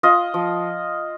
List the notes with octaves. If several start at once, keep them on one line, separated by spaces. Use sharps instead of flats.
F4 D#5
F3